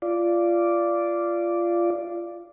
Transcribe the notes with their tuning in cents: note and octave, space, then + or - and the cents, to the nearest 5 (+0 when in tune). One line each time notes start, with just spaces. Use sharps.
F4 -20 D5 -5